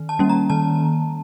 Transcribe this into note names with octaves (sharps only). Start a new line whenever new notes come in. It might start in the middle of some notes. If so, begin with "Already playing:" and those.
Already playing: D#3
A5
G3 A#3 C#4
A#5
D#3 A5